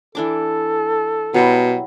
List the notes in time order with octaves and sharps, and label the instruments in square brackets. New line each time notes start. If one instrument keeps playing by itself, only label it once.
[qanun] E3 D4 D6 [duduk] A4
[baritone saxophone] B2 [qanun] F#3 G3 E4